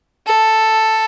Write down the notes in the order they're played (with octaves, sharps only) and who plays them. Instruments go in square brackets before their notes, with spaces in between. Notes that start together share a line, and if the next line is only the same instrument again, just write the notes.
[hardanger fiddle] A4